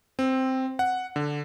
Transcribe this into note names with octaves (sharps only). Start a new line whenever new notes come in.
C4
F#5
D3